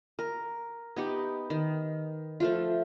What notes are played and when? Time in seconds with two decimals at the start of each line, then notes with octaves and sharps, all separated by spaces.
0.19 A#4
0.96 B3 D#4 G4
1.50 D#3
2.40 F3 A3 F4